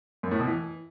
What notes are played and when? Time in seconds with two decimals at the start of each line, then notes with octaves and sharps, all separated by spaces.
0.23 F#2
0.31 A2
0.39 B2
0.47 E3